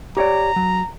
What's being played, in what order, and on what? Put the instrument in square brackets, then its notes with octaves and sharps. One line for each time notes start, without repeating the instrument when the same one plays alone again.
[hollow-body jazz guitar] G4 C#5 D5 [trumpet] A#5
[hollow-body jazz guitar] F#3